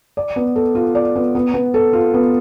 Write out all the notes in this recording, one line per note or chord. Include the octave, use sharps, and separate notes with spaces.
D5
B3
A4
F4
D5
B3
B3
B3
A4
F4
B3